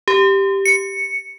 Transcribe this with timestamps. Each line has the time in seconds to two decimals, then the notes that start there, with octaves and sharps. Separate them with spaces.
0.08 G4
0.65 C#7